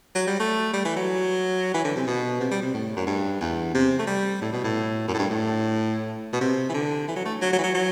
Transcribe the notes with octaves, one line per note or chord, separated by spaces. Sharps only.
F#3
G3
A3
G3
E3
F#3
E3
D3
C3
B2
C3
G3
C3
A2
F#2
G2
E2
C3
A3
G3
A2
B2
A2
F#2
A2
G2
A2
B2
C3
E3
D3
E3
F#3
A3
F#3
F#3
E3
F#3
F#3